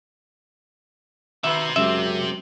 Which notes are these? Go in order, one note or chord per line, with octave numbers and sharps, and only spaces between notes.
C3 D#3 C4 F#4 B4 E5
F#2 C#3 G#3 G4 E5